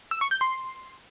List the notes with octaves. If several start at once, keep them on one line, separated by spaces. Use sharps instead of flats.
E6
C#6
G6
C6